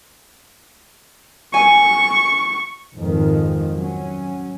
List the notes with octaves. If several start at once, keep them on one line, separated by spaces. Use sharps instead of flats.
G#5 C#6
F2 G#2 D#3 F3
F#3 C#4